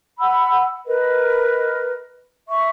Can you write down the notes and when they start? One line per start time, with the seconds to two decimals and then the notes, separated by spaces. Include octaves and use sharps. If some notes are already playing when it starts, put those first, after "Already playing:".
0.20 F#5 B5 E6
0.86 A#4 B4 D#5
2.49 E5 C#6